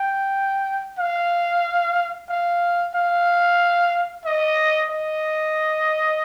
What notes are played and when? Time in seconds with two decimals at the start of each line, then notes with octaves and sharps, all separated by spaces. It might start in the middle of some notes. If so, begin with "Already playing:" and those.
Already playing: G5
0.99 F5
2.29 F5
2.94 F5
4.25 D#5
4.90 D#5